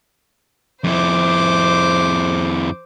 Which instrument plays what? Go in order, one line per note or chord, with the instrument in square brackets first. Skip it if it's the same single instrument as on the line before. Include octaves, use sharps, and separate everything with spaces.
[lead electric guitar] F2 E4 [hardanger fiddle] C5 D6